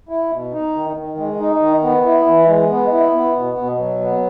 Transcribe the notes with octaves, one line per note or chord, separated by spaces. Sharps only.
E4
B2
D#4
D#3
D#3
G#3
D#4
D#3
B3
E4
E3
G#3
B3
E4
B3
B2
B2
F#3
B3